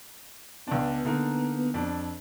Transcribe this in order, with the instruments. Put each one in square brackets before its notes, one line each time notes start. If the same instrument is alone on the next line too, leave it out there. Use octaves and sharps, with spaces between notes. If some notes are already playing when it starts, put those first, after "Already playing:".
[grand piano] C#2 D4 [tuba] B3
[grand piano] D3 A#3 D#4
F2 D4